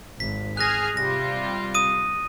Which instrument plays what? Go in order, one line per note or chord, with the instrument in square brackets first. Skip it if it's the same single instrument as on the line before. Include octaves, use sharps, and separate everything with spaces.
[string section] G#1 [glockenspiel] B6
[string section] G#4 G#5 F6 [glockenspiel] F#6 A#6
[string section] C3 G3 F4 [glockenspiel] A#6
[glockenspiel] D#6 D#7